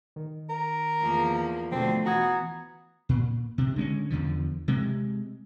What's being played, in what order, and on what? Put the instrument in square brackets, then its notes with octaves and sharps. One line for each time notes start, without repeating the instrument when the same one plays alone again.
[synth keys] D#3
[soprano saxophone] A#4
[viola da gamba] E2 F3 A#3
[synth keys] B2 F3 [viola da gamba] D3 A3 [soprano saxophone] C4
[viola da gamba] E3 B3 [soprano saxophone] F#4 [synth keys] A#5 D#6 G#6
[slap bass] A#2
C3
D3 G#3 A#3 C#4
E2 D3 F3
C3 G#3